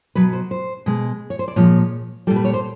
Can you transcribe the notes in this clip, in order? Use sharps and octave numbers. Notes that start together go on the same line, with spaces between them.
B2 F#3 B4
C5
C5
B2 G#3
C#5
C5
D5
A#2 F3 G#3 C#5
A#2 G3 A4
B4
C#5
C5